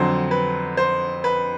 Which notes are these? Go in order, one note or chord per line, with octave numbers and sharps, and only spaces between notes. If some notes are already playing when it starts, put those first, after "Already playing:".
Already playing: F2 D3 F#3 C5
B4
C5
B4